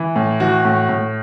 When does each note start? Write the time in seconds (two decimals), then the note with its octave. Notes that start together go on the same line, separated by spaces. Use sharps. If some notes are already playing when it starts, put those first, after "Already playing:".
Already playing: E3
0.16 A2
0.40 E3 F#4
0.65 A2
0.89 A2